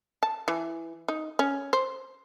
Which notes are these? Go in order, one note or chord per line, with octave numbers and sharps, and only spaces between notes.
A5
E3
D#4
C#4
C5